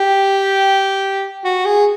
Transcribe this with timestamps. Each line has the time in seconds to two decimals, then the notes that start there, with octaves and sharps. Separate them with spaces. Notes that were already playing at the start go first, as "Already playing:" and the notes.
Already playing: G4
1.44 F#4
1.66 G#4